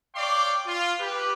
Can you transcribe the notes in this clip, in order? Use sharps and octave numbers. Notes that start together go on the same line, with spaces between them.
C#5 D5 F5 G5 C6 D6
F4
G4 B4